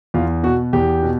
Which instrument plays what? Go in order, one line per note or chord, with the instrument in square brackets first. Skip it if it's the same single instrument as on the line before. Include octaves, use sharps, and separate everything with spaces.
[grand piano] E2 F4
B2 F#4
E2 G4
B2